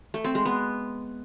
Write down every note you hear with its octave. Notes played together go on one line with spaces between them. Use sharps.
A3
C4
G#3
B3